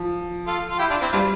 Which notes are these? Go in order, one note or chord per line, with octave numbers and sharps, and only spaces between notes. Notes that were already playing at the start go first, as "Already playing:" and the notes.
Already playing: F3
F4 A4
F4
E4 G4
D4 F4
C4 E4
G3 D4 F4